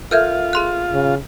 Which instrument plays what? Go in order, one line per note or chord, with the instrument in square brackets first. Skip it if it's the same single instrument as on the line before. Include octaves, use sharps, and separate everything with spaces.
[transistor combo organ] F4 [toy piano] A4 A#4 E5 [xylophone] F6 G6 G#6
[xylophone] G#4 C6 F#6
[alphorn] C#3